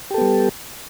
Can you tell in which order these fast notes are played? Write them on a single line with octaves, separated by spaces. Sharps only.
G4 A4 B3 G3